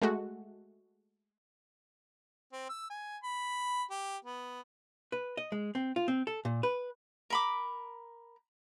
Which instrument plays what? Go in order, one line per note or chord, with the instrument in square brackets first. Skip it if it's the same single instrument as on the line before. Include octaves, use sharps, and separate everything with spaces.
[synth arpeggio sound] G#3 A3 F#4
[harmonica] C4
E6
G#5
B5
G4
B3
[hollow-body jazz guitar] B4
D#5
G#3
C4
F4
C4
A4
A#2
B4
[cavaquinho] A#4 B5 D6